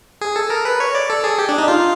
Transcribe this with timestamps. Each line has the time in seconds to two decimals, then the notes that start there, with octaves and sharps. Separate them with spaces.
0.21 G#4
0.36 A4
0.50 A#4
0.65 B4
0.80 C#5
0.95 D5
1.10 A4
1.24 G#4
1.39 G4
1.49 D4
1.58 D#4
1.68 F4